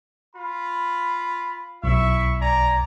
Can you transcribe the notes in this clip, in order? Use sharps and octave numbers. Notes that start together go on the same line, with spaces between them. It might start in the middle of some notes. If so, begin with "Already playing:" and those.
F4 B5
B1 E4 E5 C#6
D5 G#5 A#5